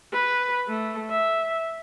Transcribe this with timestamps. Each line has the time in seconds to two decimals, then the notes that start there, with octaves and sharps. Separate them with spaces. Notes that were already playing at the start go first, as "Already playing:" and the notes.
0.13 B4
0.68 A3
1.10 E5